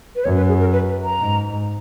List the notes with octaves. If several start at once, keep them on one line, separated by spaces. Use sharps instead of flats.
B4
F#2 C#5
B4
G#4
A#4
B4
B4
A#5
G#2